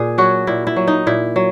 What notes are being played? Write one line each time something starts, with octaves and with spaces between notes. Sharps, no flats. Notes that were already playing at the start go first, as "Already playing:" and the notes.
Already playing: A#2 G#4
F#3 F#4
A#2 E4
E4
F#3
D#4
A#2 E4
F#3